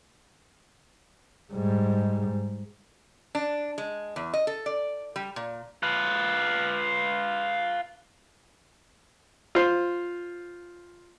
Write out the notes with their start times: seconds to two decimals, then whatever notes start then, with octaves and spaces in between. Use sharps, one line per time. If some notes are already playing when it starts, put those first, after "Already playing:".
1.53 G#2 G3
3.35 D4
3.78 G#3
4.16 E2
4.34 D#5
4.47 A4
4.66 D5
5.16 G3
5.36 A#2
5.83 F4 B4
9.55 F4 C5